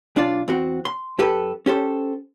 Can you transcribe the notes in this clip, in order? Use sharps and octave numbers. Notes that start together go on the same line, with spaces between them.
B1 D4 F4 D5
E2 C4 F#4
C6
F#2 G4 A4 B4
C#4 G4 A4 C5